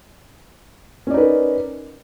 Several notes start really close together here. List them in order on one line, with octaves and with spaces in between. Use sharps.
C#4 D5 D#4 B4 A#4